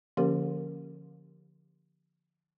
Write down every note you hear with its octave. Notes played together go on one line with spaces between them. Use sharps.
D3 F3 A#3 C#4 G4 A#4